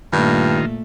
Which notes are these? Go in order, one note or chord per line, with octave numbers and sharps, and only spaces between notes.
G2 A#2 D#3 A3 F4